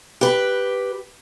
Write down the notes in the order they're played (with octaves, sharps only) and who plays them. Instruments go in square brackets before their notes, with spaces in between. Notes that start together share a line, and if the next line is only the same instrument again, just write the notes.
[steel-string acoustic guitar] G4 B4